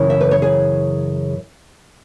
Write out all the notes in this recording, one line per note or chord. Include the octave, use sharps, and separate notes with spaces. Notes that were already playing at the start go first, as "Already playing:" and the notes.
Already playing: F#2 C#3 E3
E5
B4
C#5
G#4